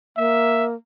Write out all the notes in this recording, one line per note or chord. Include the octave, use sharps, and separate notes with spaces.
A#3 E5